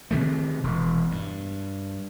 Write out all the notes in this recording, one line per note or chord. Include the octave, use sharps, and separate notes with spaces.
C3 D#3 A3
E1
G2